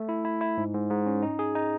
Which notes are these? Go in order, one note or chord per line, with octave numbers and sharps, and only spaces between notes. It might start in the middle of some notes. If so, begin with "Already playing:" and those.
Already playing: A3
E4
E4
E4
G#2
G#2
G#2
C#4
D#4
G#4
D#4